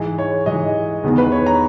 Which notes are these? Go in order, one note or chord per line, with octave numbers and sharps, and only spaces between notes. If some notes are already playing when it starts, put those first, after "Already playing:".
Already playing: G#2 E3 G#3
C#5
G#2 E3 G#3 D#5
E2 D#3 G#3 B3
B4
C#5
A#5